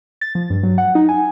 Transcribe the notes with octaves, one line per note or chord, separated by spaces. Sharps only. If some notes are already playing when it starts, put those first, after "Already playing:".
A6
F3
G2
F#3
F#5
D#4
G#5